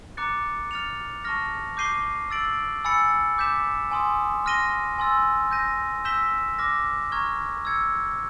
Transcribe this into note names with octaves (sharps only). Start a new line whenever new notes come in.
A#5 D6 F#6 A6 C#7
F6 A6 C#7 F7
A5 C#6 F6 A#6
D6 G6 C7 D#7 G7
E6 A6 D7 F#7
G#5 B5 E6 A6 C#7
D6 G6 B6 E7
G#5 C6 D#6
C6 F6 A#6 D#7 G7
G#5 C6 E6 A6
G6 A#6 D#7
E6 G6 B6 E7 G7
D6 F6 A#6
A#5 C#6 F6 G#6
E6 G#6 C#7